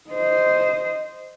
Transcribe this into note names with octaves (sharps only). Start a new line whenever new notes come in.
C5 D#5